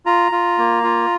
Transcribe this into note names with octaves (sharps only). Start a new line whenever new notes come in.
F4 A#5
F4
A#3
F4